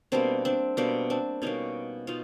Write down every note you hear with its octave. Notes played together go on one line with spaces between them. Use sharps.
B2 G3 A#3 C4 D4
C4 D4
B2 G3 A#3 C4 D4
C4 D4
B2 G3 A#3 C#4 D#4
B2 D#4 F4